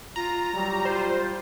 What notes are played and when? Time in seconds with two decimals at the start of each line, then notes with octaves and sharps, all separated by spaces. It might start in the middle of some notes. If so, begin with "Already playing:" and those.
0.16 F4 A#5
0.55 F#3 G3
0.85 F4 C5